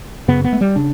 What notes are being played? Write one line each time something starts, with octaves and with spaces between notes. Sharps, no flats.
F#2 C#3 B3
B3
A3
G3
C#3 D4